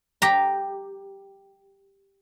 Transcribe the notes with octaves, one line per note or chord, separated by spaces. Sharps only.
G4 G5 A#5